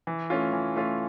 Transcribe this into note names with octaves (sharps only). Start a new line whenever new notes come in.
E3
A3 C#4 F4
E3
A3 C#4 F4